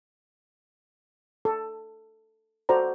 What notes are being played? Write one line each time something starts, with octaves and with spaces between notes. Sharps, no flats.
A4
F#4 A4 C5 D5 A#5